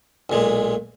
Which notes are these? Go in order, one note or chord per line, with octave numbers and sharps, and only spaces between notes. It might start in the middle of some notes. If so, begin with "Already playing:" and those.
B1 A#2 G#3